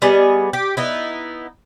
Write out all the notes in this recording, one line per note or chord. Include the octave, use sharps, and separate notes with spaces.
G3 B3 G#4 D#5
G4
B3 D#4 E4